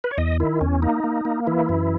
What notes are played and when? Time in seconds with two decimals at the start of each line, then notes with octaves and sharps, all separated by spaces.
0.04 B4
0.11 C#5
0.18 E2 D#5
0.40 D#3 E4
0.61 E2 C#4
0.82 A#3 D#4
1.04 A#3
1.25 A#3
1.47 E3 E4
1.69 F#2